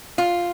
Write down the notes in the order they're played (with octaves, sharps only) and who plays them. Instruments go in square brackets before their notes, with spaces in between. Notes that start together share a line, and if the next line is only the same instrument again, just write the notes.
[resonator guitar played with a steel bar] F4